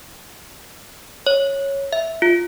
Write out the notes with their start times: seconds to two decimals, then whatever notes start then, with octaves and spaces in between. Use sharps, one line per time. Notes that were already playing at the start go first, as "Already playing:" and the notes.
1.27 C#5
1.93 E5
2.22 F4